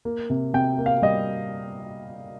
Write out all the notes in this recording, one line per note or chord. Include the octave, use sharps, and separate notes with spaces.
A#3
C3
C3 G5
A#3
F5
G3 D#5